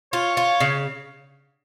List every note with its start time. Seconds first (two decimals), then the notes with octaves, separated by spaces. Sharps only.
0.13 F4 C#5
0.37 F4
0.60 C#3